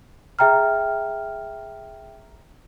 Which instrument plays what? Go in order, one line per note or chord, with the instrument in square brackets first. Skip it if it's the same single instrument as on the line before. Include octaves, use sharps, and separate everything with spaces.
[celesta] G#4 E5 G5 A#5 F6